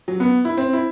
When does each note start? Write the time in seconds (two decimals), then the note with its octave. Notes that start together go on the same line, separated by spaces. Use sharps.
0.08 F#3
0.20 B3
0.45 E4
0.57 C4
0.73 E4